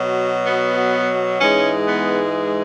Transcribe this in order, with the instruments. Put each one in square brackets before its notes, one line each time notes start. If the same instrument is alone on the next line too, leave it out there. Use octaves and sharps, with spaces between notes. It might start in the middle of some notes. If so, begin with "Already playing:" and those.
Already playing: [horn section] B2 F#3
B3
G#2 E3 G#3 C#4
B3